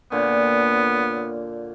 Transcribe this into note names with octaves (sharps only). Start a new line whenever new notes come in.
A#2 D3 B3 C#5